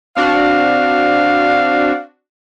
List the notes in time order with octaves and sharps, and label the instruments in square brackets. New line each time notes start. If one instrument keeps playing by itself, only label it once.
[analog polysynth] C4 D4 F#4 [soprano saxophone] F5